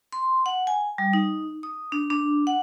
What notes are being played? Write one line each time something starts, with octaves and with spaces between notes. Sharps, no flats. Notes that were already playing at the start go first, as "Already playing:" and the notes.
C6
F#5
G#5
G3
D#4
D#6
D4
D4
F#5